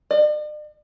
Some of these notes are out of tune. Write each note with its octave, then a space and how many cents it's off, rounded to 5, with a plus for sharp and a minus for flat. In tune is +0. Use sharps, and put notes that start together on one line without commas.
D5 +45